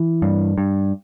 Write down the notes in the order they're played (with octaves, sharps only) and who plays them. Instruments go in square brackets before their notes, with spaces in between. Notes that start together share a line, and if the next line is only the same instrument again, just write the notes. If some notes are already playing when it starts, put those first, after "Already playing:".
Already playing: [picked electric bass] E3
G2
G2